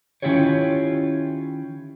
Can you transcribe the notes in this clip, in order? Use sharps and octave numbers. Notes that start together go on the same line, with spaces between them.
D#3 C#4 E4 F4 G4 C#5